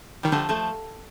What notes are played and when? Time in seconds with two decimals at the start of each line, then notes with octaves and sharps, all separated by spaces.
0.23 D#3 G3
0.32 D3 F3 A3
0.49 F3 A3